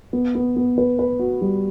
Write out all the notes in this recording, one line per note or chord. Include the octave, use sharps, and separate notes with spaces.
B3
B3
B3
B4
B4
F#4
G3